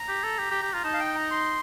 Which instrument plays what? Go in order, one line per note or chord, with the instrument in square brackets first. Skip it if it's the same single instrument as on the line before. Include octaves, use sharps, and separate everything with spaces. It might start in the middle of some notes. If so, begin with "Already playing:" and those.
Already playing: [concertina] A#5
[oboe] G4
A4
G4
G4
G4
[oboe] F4 [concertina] A#5
[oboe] D#4 [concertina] A5
[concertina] F5
G5
A#5
C6